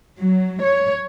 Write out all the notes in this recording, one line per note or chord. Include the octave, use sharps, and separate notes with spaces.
F#3
C#5